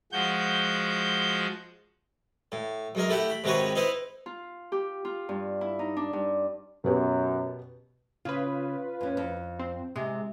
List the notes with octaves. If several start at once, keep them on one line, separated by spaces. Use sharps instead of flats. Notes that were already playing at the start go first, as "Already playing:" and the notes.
F3 G#3 F#4 G6
A2
F#2 G#3 A#4
A3 E4 G4 F#5 G5
B5
G#2 C3 D#3 F#4 B4 C#5
D#4 E4 B4 C5
F4
G4
F4
G2
E4
D#4
D4
G2
F#2 B2 B3 G4
C#3 F4 B4
F2 C#4
F2
C4
C3 G#3